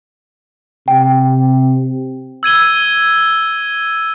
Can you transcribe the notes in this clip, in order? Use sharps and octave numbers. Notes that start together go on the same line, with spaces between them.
C3 G5
E6 G#6 D#7 G7